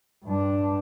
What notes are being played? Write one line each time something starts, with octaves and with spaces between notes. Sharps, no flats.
G2 D4